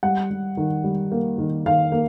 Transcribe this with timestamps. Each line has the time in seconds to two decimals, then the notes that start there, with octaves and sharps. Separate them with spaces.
0.03 G3 F#5
0.30 G3
0.57 D#3
0.84 G3
1.12 A#3
1.38 D#3
1.66 D#3 F5
1.92 A#3